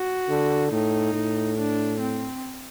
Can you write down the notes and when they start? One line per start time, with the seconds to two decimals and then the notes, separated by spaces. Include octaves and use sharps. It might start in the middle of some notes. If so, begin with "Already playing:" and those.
Already playing: F#4
0.29 D3
0.72 A2 D#4
1.14 A2
1.58 D4
2.01 C4